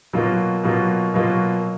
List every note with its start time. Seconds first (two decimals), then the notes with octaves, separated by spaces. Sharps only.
0.13 B2 F#3 A#3 F4
0.63 B2 F#3 A#3 F4
1.14 B2 F#3 A#3 F4